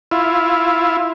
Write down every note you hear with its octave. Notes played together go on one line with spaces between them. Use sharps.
E4 F4